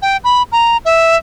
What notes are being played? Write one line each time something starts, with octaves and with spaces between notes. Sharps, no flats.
G5
B5
A#5
E5